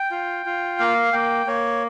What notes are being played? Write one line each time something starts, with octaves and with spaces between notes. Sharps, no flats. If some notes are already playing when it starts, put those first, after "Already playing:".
Already playing: G5
F4
F4
A#3 F5
A#3 G5
A#3 C#5